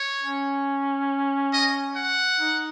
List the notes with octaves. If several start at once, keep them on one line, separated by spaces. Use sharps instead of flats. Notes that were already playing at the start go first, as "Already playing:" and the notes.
Already playing: C#5
C#4
D#5
F#5
D#4